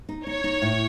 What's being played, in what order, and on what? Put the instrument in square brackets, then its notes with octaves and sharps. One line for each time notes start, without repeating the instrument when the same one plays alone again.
[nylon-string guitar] D#4
[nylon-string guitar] D#4 [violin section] C#5
[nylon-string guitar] D#4
A2